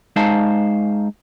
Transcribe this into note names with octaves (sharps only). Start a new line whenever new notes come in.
G#3 D#4 C5 F5 A5